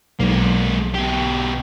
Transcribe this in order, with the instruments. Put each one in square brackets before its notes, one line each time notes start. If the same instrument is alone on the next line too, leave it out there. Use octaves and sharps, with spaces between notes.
[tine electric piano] B1 [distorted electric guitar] G#3 A#3
[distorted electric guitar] B2 G4